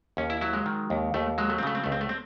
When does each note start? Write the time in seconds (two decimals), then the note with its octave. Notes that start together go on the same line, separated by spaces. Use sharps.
0.17 D#2 C#4
0.30 E4
0.41 F#3 E4
0.53 G#3
0.66 D#3
0.90 D#2
1.14 D#2 A3
1.38 F#3 G#3
1.50 A3
1.58 C4
1.63 C#3 A3
1.75 C4
1.84 C#2 A3
1.92 C4
2.01 A3
2.09 C4